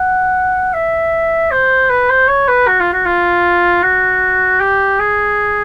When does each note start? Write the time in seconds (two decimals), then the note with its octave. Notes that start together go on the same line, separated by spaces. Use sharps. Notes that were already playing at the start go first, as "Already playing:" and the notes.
Already playing: F#5
0.74 E5
1.51 C5
1.90 B4
2.10 C5
2.28 C#5
2.48 B4
2.67 F#4
2.80 F4
2.93 F#4
3.05 F4
3.83 F#4
4.60 G4
4.99 G#4